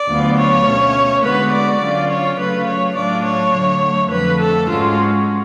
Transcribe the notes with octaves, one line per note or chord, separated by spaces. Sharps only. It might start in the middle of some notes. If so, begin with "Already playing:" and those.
Already playing: D5
D2 D3 F#3 B3 F4
C#5
B2 A3 C#4
D3 G#3 B3 F#4 B4
D5
D3 F#3 C#4 F4
C#5
C#3 F#3 A3 F4 B4
C#5
A2 F#3 A3 D4 F4 D5
C#5
D3 F#3 A3
F2 D3 F3 A3 B4
A4
G#2 G#3 C#4 F4 F#4